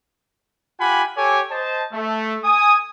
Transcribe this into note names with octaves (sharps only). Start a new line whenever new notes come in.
F4 G4 F#5 G#5 B5
G4 A4 C#5 G#5 D6
C5 D#5 A5
A3
G#5 D#6